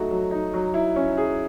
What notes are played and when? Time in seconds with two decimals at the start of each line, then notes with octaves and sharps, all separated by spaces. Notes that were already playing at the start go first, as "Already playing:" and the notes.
Already playing: F#3 A3 D#4 F#4
0.11 F#3
0.31 D#4
0.54 F#3
0.74 E4
0.96 C#4
1.17 G#4